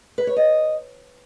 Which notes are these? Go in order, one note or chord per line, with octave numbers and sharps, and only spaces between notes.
B4
C#5
D#5